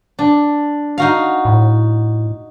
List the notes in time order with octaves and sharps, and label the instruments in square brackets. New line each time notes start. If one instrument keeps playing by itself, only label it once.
[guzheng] D4
D#4 F#4 F5
[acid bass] A2